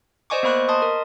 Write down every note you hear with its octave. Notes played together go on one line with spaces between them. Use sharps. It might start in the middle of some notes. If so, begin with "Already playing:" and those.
C5 D5 D#5 G#5 C#6 D6
A#3 B3 C5 B5 C#6 F#6
D#5 A5 C6 D#6
A#4